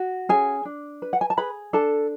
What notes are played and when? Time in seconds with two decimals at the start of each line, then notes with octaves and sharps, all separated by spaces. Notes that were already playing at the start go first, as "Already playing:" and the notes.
Already playing: F#4
0.29 C#4 G#4 G#5
0.65 D4
1.02 B4
1.13 F#5
1.21 G#5
1.30 A5
1.37 G#4 B4 B5
1.73 D4 A4 A5